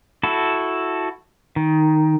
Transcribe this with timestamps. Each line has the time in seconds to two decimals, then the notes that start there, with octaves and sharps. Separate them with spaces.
0.23 E4 F#4 A4
1.56 D#3